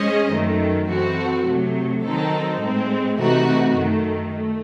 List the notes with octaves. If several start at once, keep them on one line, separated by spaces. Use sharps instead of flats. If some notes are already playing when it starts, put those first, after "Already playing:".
Already playing: G#3 C#4 G#4 C5 D#5
F#2 D#3 A3
E3 C4 F#4 A4
C3 F#3 A3
D#3 F#3 C4 D#4 A4
A2 G#3 C4
C3 E3 A3 D#4 F#4
F#2 D#3 A3
A3